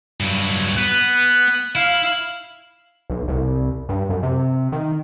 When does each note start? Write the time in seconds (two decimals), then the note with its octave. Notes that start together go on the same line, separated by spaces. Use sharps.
0.20 G2 F#3
0.78 B3 F#6
1.75 E4 F5
3.10 B1
3.28 C2
3.89 G2
4.09 F#2
4.23 C3
4.72 D#3